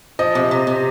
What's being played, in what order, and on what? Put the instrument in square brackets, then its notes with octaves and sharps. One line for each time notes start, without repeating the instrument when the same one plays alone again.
[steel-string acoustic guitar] F3 [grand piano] D#5
[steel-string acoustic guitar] C3
C3
C3